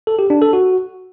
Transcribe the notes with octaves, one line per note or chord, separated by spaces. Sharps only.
A4
G4
D4
A4
F#4